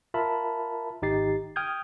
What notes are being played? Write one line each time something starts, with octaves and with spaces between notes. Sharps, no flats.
F4 A#4 E5 A5 B5
G#1 D#4 G4 A6 C7
G5 D#6 F6 G6 G#6